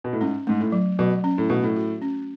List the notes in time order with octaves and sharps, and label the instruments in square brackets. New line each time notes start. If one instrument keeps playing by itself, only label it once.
[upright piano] B2
A2
[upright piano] G#2 [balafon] C#4
[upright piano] G#2 [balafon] A3
[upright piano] A2
[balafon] F#3
[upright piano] B2 [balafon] F#3
[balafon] C#4
[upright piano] A2
[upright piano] B2 [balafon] A3
[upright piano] A2
[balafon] F#4
C#4